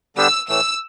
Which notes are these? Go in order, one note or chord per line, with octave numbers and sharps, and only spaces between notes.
D3 G3 B3 D4 G4 E6
A2 E3 A3 E6